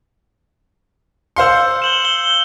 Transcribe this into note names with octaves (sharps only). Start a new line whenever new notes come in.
C5 F5 C6 E6 C#7
G6
E7 F#7 G7
G7